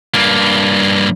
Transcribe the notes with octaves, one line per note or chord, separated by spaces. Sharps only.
G2 A#3